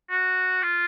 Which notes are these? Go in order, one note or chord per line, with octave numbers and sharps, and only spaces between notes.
F#4
F4